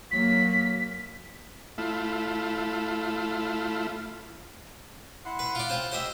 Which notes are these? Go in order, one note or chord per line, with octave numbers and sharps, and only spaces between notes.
F#3 A#3 B6
A3 E4 F4
E4 F#5 C6
B4
F4 D5
C4 C#4 F4 C5
G4 C5 D#5 E5